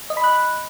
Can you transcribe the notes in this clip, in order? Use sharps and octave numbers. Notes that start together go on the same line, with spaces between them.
D#5
B5
F#6